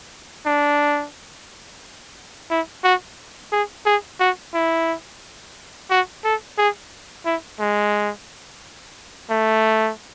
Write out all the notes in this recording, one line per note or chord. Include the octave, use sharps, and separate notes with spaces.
D4
E4
F#4
G#4
G#4
F#4
E4
F#4
A4
G#4
E4
G#3
A3